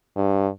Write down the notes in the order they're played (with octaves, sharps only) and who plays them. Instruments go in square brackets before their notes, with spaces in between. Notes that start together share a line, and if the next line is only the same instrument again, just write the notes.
[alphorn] G2